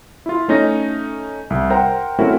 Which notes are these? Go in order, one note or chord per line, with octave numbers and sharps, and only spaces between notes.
E4 F4
A3 C#4 D#4 A#6
C2
A#4 C5 F#5 G5 A#5
A3 C4 C#4 E4 F#4 A#4